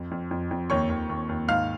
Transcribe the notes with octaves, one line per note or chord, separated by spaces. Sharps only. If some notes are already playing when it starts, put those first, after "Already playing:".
Already playing: F2
F2
F2
F2
D#2 C#5 C#6
D#2
D#2
D#2
G#2 F5 F6